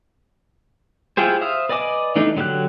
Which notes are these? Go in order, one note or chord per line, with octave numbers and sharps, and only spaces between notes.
E4 F4 G4 G#4 C5
C5 E5 F5 D#6
B4 D5 D#5 G#5 D6
E3 A3 D4 D#4
D3 F#3 G3 G4 F#6